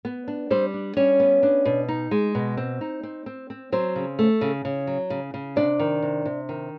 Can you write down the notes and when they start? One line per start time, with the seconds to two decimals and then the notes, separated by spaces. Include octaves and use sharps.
0.05 B3
0.28 D4
0.50 G3 C4 C5
0.74 D4
0.97 G3 C#4 C#5
1.20 B3
1.43 D4
1.65 B2
1.89 D#4
2.11 G#3
2.35 B2
2.57 C4
2.81 D#4
3.03 C4
3.26 C4
3.50 C4
3.72 F#3 C4 C5
3.95 C#3
4.19 A3
4.41 C#3
4.65 C#3
4.87 F#3
5.10 C#3
5.34 C#3
5.56 C3 D4 D5
5.80 D#3
6.02 C3
6.25 C3
6.49 D#3